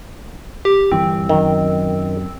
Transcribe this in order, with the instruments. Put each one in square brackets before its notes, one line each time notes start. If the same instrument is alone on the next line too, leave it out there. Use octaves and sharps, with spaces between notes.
[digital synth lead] G4
[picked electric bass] G1 E3 G3 [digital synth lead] C4
[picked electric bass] F#2 F#3 [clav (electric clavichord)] D#3